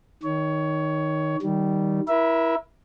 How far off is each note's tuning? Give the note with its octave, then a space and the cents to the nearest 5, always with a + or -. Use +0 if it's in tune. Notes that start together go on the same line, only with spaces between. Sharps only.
D#3 +0 C#5 +15
D#3 +0 G3 -15
E4 +0 A#4 +40 E5 +0